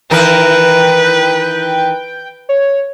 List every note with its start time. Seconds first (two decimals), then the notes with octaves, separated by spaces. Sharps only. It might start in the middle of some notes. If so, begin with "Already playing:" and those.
0.11 D#3 E3 A#4 B4 G5
2.49 C#5